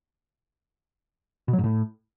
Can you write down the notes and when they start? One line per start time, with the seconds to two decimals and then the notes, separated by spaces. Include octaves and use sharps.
1.48 B2
1.53 F#3
1.58 G#2
1.64 A2